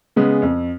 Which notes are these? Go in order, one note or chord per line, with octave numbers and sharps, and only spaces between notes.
C#3 G#3 B3
F2